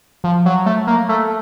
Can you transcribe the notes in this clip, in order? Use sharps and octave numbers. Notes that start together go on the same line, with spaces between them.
F3
F#3
A3
A#3
A3